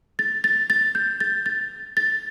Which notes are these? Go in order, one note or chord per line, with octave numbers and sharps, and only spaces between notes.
A6
A6
A6
G6
A6
A6
A6